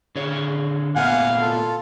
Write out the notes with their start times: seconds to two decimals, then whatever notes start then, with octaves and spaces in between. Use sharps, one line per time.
0.16 D3 G#4 C#5
0.96 A#2 A3 B3 F5 F#5 G#5
1.41 F4 A4